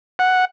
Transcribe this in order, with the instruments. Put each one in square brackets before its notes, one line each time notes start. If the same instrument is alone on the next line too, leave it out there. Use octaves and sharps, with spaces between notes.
[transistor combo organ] F#5